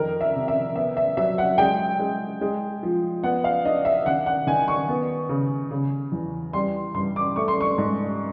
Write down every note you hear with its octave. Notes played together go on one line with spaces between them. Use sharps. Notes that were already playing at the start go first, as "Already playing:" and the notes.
Already playing: F2 D#3 A#4
E5
C3
E5
B3 E5
E5
F#3 E5
F#5
G#3 G5
G#3
G#3
F3
B3 F#5
F5
D4 D#5
E5
D#3 F#5
F#5
D#3 G#5
C#6
B3
C#3
C#3
E2
G3 C6
G2 C6
D6
A3 C#6
C6
C#6
G#2